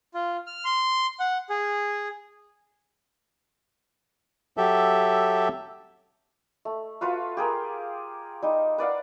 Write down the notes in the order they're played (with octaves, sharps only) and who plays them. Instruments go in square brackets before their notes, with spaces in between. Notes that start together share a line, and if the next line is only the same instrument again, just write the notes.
[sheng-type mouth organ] F4
F6
C6
F#5
G#4
[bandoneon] F#3 G4 A4 E5
[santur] A3
F4 F#4 B4 F5
G4 G#4 A#4
G3 D#4
B4 D5 F5 F#5